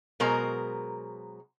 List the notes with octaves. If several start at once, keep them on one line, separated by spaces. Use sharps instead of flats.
B2 F#3 G#3 A#4 C5 A#5